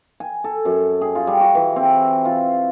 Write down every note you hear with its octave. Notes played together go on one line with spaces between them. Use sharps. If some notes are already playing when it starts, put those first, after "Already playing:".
G#5
A4
F#2
G#4
F4
G3
F#4
E3
C4
F4